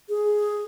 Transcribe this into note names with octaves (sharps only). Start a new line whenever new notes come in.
G#4